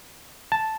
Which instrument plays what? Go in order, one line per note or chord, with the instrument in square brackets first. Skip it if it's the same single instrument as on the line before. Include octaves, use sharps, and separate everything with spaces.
[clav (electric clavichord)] A5